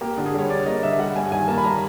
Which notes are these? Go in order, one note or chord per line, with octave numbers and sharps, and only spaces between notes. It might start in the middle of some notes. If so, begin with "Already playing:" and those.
A#3 G4
D3
G#4
G3 C#5
D4 D5
A#3 D#5
D3 E5
G3 F#5
G2 G#5
D#3 G#5
A#3 A5
B5
G3 A#5